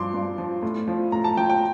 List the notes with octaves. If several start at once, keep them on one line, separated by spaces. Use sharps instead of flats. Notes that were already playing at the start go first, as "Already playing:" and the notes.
Already playing: G2 F3 C6 D6
G2
F3
A2
F3
A2 A#5
A5
F3 G5
G5